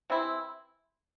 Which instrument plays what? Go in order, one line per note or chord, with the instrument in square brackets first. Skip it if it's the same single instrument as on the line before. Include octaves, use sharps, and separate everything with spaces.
[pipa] C3 E3 C4 E4